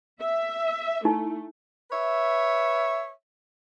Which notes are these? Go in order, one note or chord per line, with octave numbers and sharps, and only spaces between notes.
E5
A3 D#4 E4
B4 C#5 E5